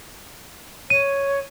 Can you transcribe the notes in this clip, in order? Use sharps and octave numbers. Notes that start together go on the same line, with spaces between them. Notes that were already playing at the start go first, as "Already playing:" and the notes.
C#5 D#7